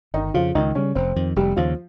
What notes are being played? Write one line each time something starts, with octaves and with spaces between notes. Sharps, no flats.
G1 D#3 D#4
F2 C#3 F3 F4
C#2 D#3 D#4
C#3 G3 C#4
F1 C4
F2 D#3
F1 G3 G4
D#2 C#3 F3 F4